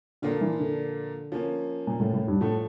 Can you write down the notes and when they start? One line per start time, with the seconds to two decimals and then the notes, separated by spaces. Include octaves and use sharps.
0.22 A#2 D3 F3 A#3 D4 F4
0.41 E3
0.59 D3
1.32 F3 A#3 C#4
1.87 A#2
2.00 A2
2.14 A2
2.28 G2
2.41 A2 F3 A3 D4 A4